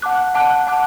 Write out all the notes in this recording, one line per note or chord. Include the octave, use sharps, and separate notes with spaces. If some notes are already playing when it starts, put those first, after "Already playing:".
F#5 A5 D6 F#6
F#5 A5 D6 F#6
F#5 A5 D6 F#6